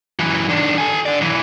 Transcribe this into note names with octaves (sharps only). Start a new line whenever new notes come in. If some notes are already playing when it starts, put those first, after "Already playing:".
F#2 E3
D#3 D4
A4 G#5
D3 D5
B1 E3